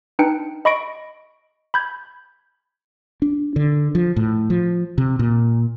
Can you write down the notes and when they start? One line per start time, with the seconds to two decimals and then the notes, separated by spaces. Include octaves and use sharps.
0.19 D4 D#4 B4 G5 C#7
0.65 D#5 B5 C#6 A#6 D7
1.74 B5 G6 G#6
3.22 D4
3.56 D3
3.95 F3
4.16 A2
4.50 F3
4.98 C3
5.19 A#2